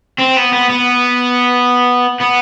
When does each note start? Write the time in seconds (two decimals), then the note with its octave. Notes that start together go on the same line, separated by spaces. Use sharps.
0.18 C4
0.36 B3
0.53 B3
0.70 B3
2.21 B3